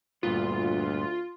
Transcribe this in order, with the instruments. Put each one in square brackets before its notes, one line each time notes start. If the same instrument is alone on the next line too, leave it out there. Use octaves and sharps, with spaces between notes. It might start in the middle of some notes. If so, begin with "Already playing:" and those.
[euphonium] D2 [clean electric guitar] G2 A#2 B3 [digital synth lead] F4